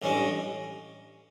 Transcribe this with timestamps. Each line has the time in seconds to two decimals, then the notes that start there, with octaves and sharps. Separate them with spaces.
0.02 A1 G2 E3 G#3 C#4